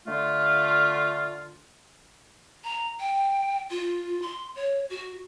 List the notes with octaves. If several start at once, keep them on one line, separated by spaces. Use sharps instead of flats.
D3 A3 F4
A#5
G5
F4
C6
C#5
F#4